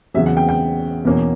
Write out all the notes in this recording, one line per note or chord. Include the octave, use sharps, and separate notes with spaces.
E2 C#3 F#3 E5
F#5
G5
G5
E2 B2 A#3 C#4